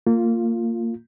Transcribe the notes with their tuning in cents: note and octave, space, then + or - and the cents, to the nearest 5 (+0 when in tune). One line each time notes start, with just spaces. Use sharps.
A#3 -25 F4 +0